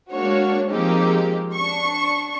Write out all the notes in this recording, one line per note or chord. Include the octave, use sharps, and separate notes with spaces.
G#3 A#3 D4 F#4 C#5
F3 G#3 A#3 C4 D#4 G4
D4 C#6